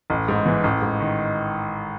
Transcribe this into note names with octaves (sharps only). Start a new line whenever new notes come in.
A1
G#2
E3
A1
G#2
D#3